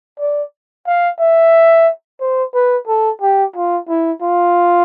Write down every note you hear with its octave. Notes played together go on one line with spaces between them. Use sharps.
D5
F5
E5
C5
B4
A4
G4
F4
E4
F4